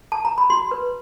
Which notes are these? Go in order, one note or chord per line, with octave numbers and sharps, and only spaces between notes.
A5
A#5
B5
F#4 C6
B4